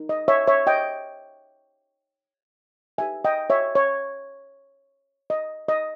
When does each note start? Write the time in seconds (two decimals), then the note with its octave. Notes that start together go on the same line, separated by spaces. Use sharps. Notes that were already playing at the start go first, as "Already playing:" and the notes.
Already playing: D#4 A#4
0.09 D#5
0.28 C#5 E5
0.47 C#5 E5
0.67 D#5 G5
2.98 D#4 G4 B4 E5 G#5
3.25 D#5 G5
3.50 C#5 E5
3.75 C#5
5.30 D#5
5.68 D#5